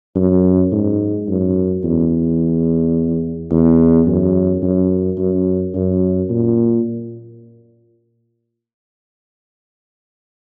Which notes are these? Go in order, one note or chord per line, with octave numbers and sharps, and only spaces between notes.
F#2
G#2
F#2
E2
E2
F#2
F#2
F#2
F#2
A#2